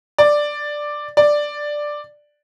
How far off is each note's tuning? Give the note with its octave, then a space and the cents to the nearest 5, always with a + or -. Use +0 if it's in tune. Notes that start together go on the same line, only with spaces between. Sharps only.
D5 +5
D5 +5